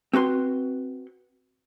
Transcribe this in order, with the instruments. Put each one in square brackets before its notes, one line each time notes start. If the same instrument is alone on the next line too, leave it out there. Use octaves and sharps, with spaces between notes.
[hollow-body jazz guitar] C4 F#4 B4 C6